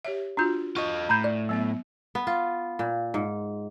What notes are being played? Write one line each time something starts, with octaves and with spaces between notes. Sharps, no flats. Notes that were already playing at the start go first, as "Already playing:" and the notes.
G4 C#5 E5
D4 F4 F#4 A#5 G6
F4 D#5 C#6
A2 A#5 B5 G6
D5
F#3 B3 E5
B3
F4
A#2
G#2